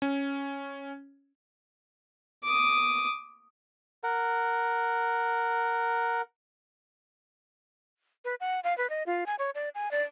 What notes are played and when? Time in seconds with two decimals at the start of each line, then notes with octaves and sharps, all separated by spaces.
0.02 C#4
2.44 D6 D#6
4.04 A#4 F#5
8.25 B4
8.40 F#5
8.64 F5
8.78 B4
8.90 D#5
9.06 F4
9.26 G#5
9.39 C#5
9.55 D5
9.75 G#5
9.91 D5